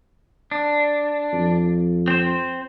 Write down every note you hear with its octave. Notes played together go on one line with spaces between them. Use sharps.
D4
F2
C4 C5